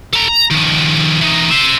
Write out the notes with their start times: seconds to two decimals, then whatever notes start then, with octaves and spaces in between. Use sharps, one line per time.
0.13 A4 A#5
0.28 A#5
0.51 D#3 F3
1.21 E3 D#4
1.51 C5 E5